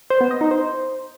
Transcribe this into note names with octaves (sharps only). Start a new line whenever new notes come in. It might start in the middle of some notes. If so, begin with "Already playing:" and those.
C5
B3
D#5
D#4
C5